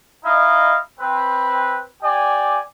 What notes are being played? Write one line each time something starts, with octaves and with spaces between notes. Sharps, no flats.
D#4 E4 D#5 F5
C4 B4
G4 D5 G#5